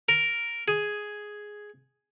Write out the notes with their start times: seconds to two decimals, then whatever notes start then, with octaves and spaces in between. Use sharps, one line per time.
0.09 A#4
0.68 G#4